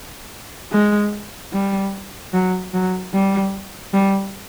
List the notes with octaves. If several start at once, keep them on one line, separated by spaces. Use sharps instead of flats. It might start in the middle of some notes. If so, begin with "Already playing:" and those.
G#3
G3
F#3
F#3
G3
G3